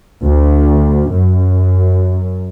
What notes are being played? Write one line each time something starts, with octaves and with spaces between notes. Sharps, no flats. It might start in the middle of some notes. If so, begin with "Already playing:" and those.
D2
F#2